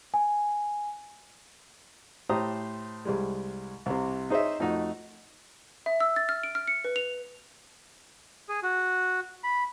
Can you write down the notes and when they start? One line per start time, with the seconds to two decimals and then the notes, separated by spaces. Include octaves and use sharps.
0.14 G#5
2.29 A2 G4 C5 A#5 D#6
3.05 C2 G3 G#3
3.86 C2 C3
4.30 D#4 G#4 C5 C#5 D#5 E5
4.60 F2 A3 D#4 F#4
5.86 E5
6.00 E6
6.16 A6
6.29 F6
6.43 D7
6.55 F6
6.68 C#7
6.84 B4
6.96 F7
8.49 G#4
8.63 F#4
9.44 B5